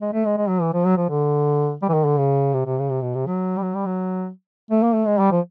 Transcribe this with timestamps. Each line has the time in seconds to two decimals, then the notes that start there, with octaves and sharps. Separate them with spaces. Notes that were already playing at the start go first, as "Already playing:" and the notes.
0.01 G#3
0.13 A3
0.25 G#3
0.38 G#3
0.49 F#3
0.62 E3
0.73 F3
0.85 F#3
0.97 F3
1.10 D3
1.82 G3
1.89 E3
1.94 D#3
2.06 D3
2.18 C#3
2.54 C3
2.66 C3
2.79 C#3
2.90 C3
3.02 B2
3.15 C3
3.27 F#3
3.57 G3
3.63 F#3
3.74 G3
3.86 F#3
4.71 A3
4.83 A#3
4.95 A3
5.07 G#3
5.18 G3
5.31 F3